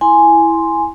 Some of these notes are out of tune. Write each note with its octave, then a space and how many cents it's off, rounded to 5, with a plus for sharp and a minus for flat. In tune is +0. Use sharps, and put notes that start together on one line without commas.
E4 +0 G#5 +0 C6 +0